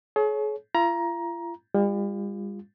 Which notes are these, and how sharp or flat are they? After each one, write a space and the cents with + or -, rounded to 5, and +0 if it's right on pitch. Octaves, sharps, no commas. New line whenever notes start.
G#4 +40 C#5 -5
F4 -40 A#5 +20
G3 +40 F4 +0